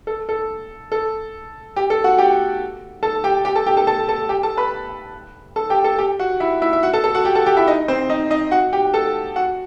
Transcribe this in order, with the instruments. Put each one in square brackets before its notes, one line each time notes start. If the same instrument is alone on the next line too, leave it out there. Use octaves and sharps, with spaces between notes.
[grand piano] A4
A4
A4
G4
A4
F#4 F#5
G4 G5
A4 A5
G4 G5
G4 G5
A4 A5
G4 G5
A4 A5
A4 A5
A4 A5
G4 G5
A4 A5
B4 B5
A4 A5
G4 G5
A4 A5
G4 G5
F#4 F#5
E4 E5
E4 E5
E5
F#4 F#5
A4 A5
A4 A5
F#4 F#5
G4 G5
A4 A5
G4 G5
E4 E5
D#4 D#5
C4 C5
D#4 D#5
D#4 D#5
F#4 F#5
G4 G5
A4 A5
F#4 F#5